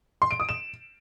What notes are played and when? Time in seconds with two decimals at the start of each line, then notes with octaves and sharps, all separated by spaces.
0.22 C6
0.31 D7
0.40 D#6
0.49 E7